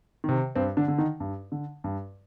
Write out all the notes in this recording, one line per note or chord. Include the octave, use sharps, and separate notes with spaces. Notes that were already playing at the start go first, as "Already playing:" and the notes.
C3 D#3
G2 C4
D3 D4
D3
D#3 D#4
G2
D3
G2